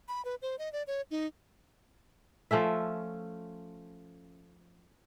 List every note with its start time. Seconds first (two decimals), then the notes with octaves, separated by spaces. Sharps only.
0.08 B5
0.25 B4
0.42 C5
0.59 D#5
0.73 D5
0.87 C#5
1.11 D#4
2.51 F3 A3 C#4 E5